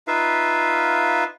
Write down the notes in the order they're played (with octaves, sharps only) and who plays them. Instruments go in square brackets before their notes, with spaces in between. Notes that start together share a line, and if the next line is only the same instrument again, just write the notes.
[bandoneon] D#4 F4 B4 E5 F5